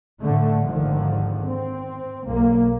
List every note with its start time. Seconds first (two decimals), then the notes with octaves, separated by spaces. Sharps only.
0.21 A2 D3 A3
0.67 G#1 D#2 D3 D#3 F3
1.44 C4
2.25 B1 A#3